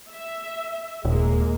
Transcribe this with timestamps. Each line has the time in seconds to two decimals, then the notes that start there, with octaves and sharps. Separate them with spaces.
0.11 E5
1.05 D#1 G#3 A#3